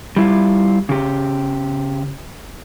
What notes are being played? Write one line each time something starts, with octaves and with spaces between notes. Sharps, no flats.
G3 E4 F4
C#3 G4